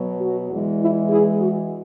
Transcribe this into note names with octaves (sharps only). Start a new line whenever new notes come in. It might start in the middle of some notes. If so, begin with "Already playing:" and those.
Already playing: B2 F#3 B3
F#4
E2 E3 G#3
E4
E4 G#4
F#4